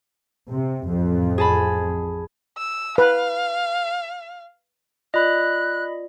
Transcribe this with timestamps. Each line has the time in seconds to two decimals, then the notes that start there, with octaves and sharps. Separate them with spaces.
0.49 C3
0.86 A1 F2 F3
1.38 G#4 A5 B5
2.58 E6
2.98 B4 F5
5.14 F4 D5 D#5 B5 F#6